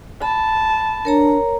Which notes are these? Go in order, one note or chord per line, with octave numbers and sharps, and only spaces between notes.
A5 B5
D4 A#4 C#5 A#5